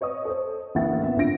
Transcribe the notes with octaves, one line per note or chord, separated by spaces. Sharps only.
B4 C#5 D#5 D#6
A4 C5
A1 D2 A#3 E4 F#5 A6
B3 E5
G#1 D3 D4 F4 A#6 D7